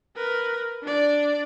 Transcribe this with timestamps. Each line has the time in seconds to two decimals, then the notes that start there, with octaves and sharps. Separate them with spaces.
0.16 A#4 B4
0.82 D4 D5